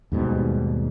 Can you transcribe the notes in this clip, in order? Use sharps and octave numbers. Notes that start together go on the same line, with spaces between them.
D#2 G#2 B2 G3